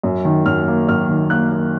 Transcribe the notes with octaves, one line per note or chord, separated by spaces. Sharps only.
F#2
D#3
F#2 F6
A#3
F#2 F6
D#3
A#3 F#6
A#3